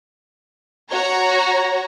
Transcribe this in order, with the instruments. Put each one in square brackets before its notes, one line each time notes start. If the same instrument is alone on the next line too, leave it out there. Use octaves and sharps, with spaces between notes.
[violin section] F#4 C#5 A#5 A#6